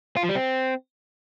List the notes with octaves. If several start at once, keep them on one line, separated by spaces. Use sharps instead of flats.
F4
F3
G3
C4